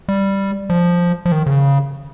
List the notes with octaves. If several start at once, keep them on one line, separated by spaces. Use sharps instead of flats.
G3
F3
F3
D#3
C#3